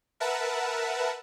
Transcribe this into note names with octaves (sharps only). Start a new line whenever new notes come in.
A#4 B4 E5 F#5 A5